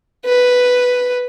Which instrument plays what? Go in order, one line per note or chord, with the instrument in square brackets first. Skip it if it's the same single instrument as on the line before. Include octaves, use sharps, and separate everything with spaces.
[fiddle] B4